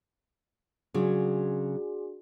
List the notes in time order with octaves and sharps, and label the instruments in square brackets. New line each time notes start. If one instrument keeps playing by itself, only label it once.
[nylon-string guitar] C#3 F#3 [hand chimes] D4 F#4 G#4